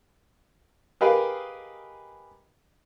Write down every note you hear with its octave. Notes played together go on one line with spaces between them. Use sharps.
G4 G#4 A#4 B4 D#5 F5